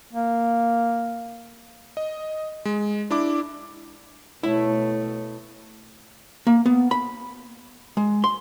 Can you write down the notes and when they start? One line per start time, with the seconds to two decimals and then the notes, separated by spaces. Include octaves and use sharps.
0.13 A#3
1.97 D#5
2.65 G#3
3.11 D4 E4 D6
4.43 B2 A3 E4 C#5
6.47 A#3
6.66 B3
6.91 B5
7.97 G#3
8.24 C6